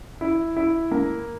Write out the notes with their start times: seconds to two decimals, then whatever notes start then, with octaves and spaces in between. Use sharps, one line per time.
0.21 E4
0.57 E4
0.91 A#3